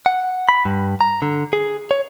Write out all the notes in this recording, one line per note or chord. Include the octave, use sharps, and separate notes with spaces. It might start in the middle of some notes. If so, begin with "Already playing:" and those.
F#5
B5
G2
A#5
D3
G#4
C#5